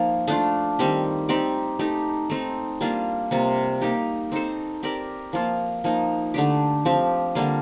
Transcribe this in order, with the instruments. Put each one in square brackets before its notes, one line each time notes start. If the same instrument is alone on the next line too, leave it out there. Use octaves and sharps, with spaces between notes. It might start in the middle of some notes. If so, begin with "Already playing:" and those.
Already playing: [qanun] F3 A#3 D#4 F4
A3 D4 F4
D#3 G3 C4 G4
C4 D#4 G4 D5
A3 D#4 G4
A3 C4 D#4
G3 A#3 D4 F4
C3 G3 A#3 F4
A#3 D#4 G4
C4 D#4 A4 C5
C4 G4 A#4 D5
F3 A#3 F4
F3 A#3 D#4
D3 A3 D4 G4
F3 C4 G4
D3 G3 A#3 F4